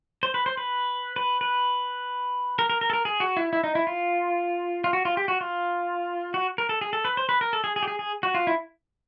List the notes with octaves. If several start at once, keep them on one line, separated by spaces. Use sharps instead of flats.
C5
B4
C5
B4
B4
B4
A#4
A#4
A#4
A4
A#4
G#4
F#4
E4
E4
D#4
E4
F4
F4
F#4
F4
G4
F#4
F4
F#4
A#4
A4
G#4
A4
B4
C5
B4
A#4
A4
G#4
G#4
G4
G#4
G#4
F#4
F4
E4